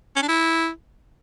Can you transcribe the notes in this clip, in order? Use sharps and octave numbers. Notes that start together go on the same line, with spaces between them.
C#4
D4
E4